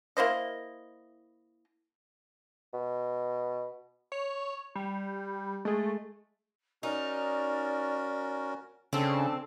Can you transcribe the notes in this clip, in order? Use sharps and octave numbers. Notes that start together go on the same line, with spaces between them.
A#3 E4 C5 D#5
B2
C#5
G3
G#3 A3 G#4
C#4 D#4 F#4 A#4 D5
C#3 C4 D4 A4